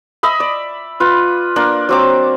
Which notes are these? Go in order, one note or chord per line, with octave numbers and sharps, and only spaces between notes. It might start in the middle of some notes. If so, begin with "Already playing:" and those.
D#5 E5 B5
D5
F4 B4
A#3 D4 D5
F#3 C4 D6